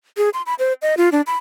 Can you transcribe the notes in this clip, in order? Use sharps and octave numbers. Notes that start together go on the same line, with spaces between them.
G#4
C6
B5
C5
D#5
F4
D4
B5